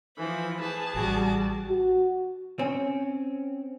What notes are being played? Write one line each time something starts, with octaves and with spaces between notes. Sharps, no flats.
E3 F3 B5
G#4 B4 A5
A1 G3 F#4 D6
F#4
C4 C#4